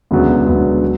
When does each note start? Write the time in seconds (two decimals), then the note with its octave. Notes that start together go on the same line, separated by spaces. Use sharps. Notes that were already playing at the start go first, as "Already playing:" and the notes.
0.11 E1 D2 C#3 F#3 B3
0.47 E1 D2 C#3 F#3 B3
0.82 F#3